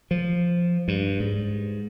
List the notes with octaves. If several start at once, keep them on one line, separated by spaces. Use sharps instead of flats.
F3
G2
G#2